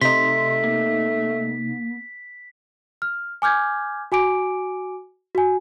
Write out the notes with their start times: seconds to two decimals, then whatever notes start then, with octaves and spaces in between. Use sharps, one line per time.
0.02 C3 A3 D#4 C6 B6
0.64 A#3
3.02 F6
3.42 G#5 D6 F6 G6 G#6
4.12 F#4 G#5 D6 D7
5.35 F#4 G#5